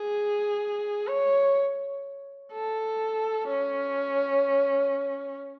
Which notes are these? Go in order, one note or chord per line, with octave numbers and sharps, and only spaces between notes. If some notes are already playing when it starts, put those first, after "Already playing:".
Already playing: G#4
C#5
A4
C#4